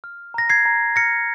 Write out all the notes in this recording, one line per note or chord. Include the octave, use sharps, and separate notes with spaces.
F6
A#5 A#6
G#6 C7
A#5
F6 A#6 C#7